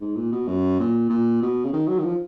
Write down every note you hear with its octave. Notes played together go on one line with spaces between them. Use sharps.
G#2
A#2
B2
F#2
A#2
A#2
B2
C#3
D#3
F#3
D#3
F3